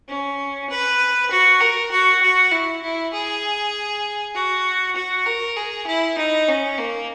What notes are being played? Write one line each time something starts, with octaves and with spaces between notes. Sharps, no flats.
C#4
B4
F#4
A#4
F#4
F#4
E4
E4
G#4
F#4
F#4
A#4
G#4
E4
D#4
C#4
A#3